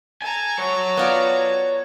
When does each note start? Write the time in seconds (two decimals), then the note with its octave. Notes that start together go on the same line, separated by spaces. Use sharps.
0.22 A4 G#5 A#5
0.58 C#5 F#5
0.97 B3 F4 D5